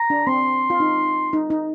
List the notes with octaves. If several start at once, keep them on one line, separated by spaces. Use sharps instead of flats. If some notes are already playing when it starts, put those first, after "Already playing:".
Already playing: A#5
D4
C4 C6
F4
D#4
D#4
D#4